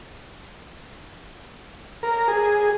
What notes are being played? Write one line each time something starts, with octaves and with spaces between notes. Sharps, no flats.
A#4
G#4